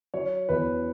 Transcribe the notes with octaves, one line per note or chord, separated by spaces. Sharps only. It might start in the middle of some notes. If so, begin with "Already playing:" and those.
F#3 C#5
E2 B4